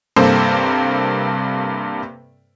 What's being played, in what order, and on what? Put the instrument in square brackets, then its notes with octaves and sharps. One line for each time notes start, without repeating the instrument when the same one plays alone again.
[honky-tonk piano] G2 C3 A#3 A4 C5